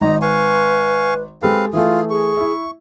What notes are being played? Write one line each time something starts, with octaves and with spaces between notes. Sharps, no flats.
G#1 D#4 A#5
B4 F5 G#5 C#6
G#3 C4 G4 A4 B4 F5
E3 A3 F4 G#4
G#4 C#6
E4 E5